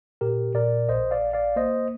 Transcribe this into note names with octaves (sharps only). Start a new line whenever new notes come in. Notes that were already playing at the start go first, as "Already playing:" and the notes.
A#2 G4 A#4
A#2 A#4 D5
A#1 C5 D#5
D5 F5
A#1
D5 F5
A#3 C5 D#5